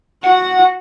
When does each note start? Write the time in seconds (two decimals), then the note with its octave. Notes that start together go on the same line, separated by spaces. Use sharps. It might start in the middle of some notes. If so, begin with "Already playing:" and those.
0.24 F#4 F#5